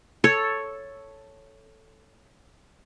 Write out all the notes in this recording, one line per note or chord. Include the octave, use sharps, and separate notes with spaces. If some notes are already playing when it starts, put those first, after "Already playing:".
A4 C#5